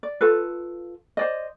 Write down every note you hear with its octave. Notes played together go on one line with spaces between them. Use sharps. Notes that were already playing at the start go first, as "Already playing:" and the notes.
D5
F4 A4 B4
C5 D5 D#5